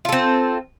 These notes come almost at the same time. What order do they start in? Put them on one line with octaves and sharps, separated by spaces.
F4 A4 C4